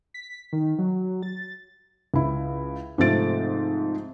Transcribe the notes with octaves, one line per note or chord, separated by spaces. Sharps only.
B6
D#3
F#3
A6
C#2 E4
G#2 C3 F3 A3 A6 D7